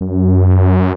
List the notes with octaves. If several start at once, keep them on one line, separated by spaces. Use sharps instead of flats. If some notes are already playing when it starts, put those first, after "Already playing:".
F#2